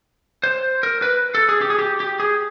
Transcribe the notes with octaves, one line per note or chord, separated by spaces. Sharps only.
C5
A#4
B4
A4
G#4
G4
G#4
G4
G4
G#4